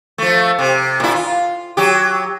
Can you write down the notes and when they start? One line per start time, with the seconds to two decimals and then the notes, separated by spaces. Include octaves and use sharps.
0.18 F3 A3
0.59 C3
1.00 A#2 E4
1.15 F4
1.77 F#3 G4